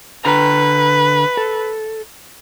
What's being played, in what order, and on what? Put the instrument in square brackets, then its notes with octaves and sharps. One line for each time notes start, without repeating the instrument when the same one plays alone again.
[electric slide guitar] D3 A#5 [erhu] B4
[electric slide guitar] A4